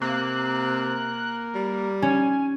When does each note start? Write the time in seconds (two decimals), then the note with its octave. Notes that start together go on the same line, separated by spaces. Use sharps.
0.02 C3 A#3 F#6
1.55 G3
2.02 C#4 G#5